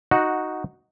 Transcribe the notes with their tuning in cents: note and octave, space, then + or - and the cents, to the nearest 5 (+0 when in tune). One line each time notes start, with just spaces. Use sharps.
D#4 +0 F#4 +0 F#5 -10